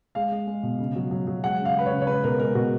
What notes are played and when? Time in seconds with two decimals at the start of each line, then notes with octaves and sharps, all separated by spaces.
0.15 G#3 F5
0.32 G#3
0.47 G#3
0.63 B2
0.79 C#3
0.95 F#3
1.11 F#3
1.27 F#3
1.43 G#3 F#5
1.60 C#3
1.65 F5
1.75 G#3 B4
1.86 C#5
1.92 C#3
2.01 C#5
2.07 G#3 B4
2.24 B2 A#4
2.39 G#3 A#4
2.55 B2 F#4